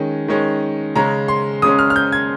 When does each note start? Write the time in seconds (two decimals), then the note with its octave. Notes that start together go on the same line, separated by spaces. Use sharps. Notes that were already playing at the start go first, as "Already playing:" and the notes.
Already playing: D#3 G#3 C#4
0.28 D#3 G#3 C#4
0.95 C#3 G#3 C#4 A#5
1.28 C6
1.62 C#3 G#3 C#4 D#6
1.79 F6
1.90 F6
1.96 G6
2.12 G#6